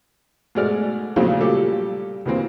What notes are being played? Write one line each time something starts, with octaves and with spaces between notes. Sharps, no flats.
G#2 B2 G#3 A3 D5 F6
A#2 C#3 F3 F#3 A3 C4
A#2 G3 G4 A4
D2 E3 A#3 C4